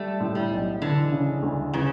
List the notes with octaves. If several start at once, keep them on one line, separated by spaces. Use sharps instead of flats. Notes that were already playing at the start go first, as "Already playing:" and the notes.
Already playing: G3 A3
A2
G3
B1
D3 E3
C#3
D2
C#3 E3